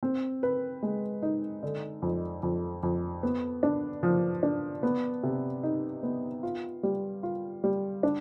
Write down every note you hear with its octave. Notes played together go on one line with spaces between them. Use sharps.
C4
B4
G#3
D#4
D3
F2
F2
F2
B3
D4
F3
D4
B3
C3
D#4
B3
F4
G3
F4
G3
D4